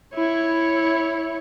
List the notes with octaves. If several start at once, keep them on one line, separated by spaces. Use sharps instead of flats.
E4 C#5